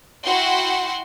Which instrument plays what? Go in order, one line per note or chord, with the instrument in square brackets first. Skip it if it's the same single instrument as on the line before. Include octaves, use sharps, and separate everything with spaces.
[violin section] E4 F#4 F#5 G5 C6